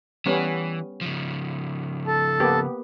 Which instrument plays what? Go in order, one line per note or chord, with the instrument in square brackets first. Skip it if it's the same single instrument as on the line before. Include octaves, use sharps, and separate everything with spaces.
[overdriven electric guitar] E3 [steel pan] G3 B3 C#4
[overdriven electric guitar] C#3 F3
[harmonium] A4 A5
[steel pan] A#3 B3 G4